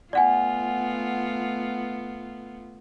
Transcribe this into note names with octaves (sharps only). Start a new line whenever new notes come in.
A3 B3 F4 D5 F#5 G#5